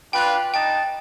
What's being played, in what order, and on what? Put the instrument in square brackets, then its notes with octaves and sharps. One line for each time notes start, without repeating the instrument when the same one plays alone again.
[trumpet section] D4 F4 B4 [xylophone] G5 F#6
[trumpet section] D#4 D#5 A5 [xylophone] G5